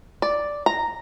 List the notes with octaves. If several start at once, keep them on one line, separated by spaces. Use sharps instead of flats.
D5
A#5